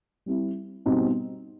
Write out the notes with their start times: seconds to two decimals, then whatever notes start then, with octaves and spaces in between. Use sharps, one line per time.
0.26 G3 C4 E4
0.86 B2 G3 C4 D#4